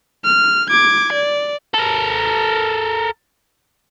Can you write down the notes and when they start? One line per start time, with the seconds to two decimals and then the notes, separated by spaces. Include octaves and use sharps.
0.25 F6
0.70 D6 G#6
1.13 D5
1.74 A4 A#4